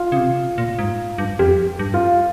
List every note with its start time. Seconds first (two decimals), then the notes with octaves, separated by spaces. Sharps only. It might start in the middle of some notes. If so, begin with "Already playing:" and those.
Already playing: F4
0.12 C#3
0.17 C3
0.58 A#2
0.79 G#2
1.18 G2
1.39 F2 G4
1.79 G2
1.94 F4